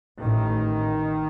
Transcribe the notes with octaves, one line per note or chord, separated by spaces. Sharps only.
A1 A2 D#3